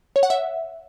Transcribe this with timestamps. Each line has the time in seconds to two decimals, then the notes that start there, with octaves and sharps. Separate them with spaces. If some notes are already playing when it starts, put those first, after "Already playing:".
0.16 C#5
0.23 F#5
0.30 E5